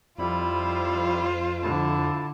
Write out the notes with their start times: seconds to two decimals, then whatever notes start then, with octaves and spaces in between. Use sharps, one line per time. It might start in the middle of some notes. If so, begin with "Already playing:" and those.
0.18 F2 G3 E4 F4 C5 B5
1.63 D3 E4 A5